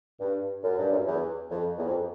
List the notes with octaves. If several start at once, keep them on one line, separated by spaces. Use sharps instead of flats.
G2
F#2
G2
F#2
E2
F2
E2
F2